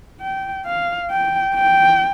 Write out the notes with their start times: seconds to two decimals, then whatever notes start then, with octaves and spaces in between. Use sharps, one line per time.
0.21 G5
0.66 F5
1.11 G5
1.55 G5